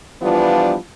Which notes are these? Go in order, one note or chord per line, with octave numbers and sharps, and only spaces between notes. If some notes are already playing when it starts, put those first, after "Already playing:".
E3 F3 G3 B3 D4 F4